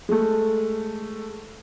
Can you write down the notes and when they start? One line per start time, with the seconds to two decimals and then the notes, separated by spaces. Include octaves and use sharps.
0.09 G#3 A3